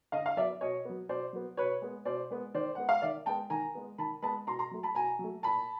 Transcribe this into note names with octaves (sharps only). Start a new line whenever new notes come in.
D3 D#5 F5
F5
F#3 B3 D5 E5
B2 C#5 D#5
F#3 B3
B2 C5 D5
F#3 B3
B2 B4 C#5
G#3 B3
B2 C5 D5
G#3 B3
D#3 C5 D5
G#3 B3 F#5
F5
D#3 D5 E5
G#3 B3 G5 A5
D#3 G#5 A#5
G#3 B3
D#3 A5 B5
G#3 B3 A5 B5
B2 A#5 C6
A#5 C6
F#3 A3
A5 B5
B2 G#5 A#5
F#3
A3
A#2 A5 B5